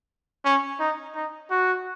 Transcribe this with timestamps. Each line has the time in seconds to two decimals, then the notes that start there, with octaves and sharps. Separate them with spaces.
0.45 C#4
0.80 D#4
1.15 D#4
1.51 F#4